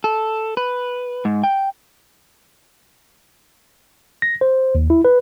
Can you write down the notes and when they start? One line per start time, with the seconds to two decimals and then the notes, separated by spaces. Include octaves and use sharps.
0.04 A4
0.57 B4
1.25 G#2
1.44 G5
4.22 A#6
4.41 C5
4.75 D#2
4.90 E4
5.05 B4